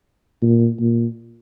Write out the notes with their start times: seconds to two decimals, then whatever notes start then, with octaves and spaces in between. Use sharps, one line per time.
0.42 A#2
0.80 A#2